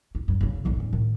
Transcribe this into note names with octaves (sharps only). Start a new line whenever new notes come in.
F4
G2
D2 C#3
A#1 D3
G#2 C#4
A2 D#3